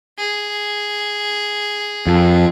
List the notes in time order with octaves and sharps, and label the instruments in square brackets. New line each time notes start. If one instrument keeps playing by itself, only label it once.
[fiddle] G#4
[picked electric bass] F2